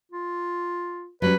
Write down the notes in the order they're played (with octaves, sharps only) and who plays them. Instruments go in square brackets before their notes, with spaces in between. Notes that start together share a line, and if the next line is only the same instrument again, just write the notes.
[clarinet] F4
[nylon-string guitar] F#3 G3 C#4 [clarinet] B4